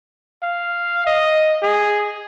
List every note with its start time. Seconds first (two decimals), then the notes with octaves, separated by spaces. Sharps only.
0.43 F5
1.06 D#5
1.63 G#4